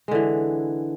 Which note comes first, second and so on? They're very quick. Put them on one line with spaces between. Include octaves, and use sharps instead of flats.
G#3 D3 E3